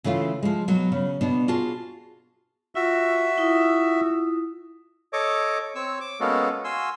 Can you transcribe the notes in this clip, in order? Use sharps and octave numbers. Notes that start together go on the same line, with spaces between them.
C#3 E3 A3 F4
F3 G#3
B2 F#3
C#3
B2 B3 D4
F4 F#4 G#4 A5
F4 F#4 E5
E4 F4 D#6
A4 C#5 D#5 D6
C4 C#5 E6
D6
G#3 A#3 B3 C#4 F#4 A4
F#4 F5 G#5 C6 E6